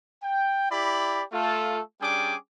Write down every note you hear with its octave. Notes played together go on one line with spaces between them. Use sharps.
G5
E4 G4 D5 B5
A3 F4 A4
G3 C#4 D4 G#4 G5 D6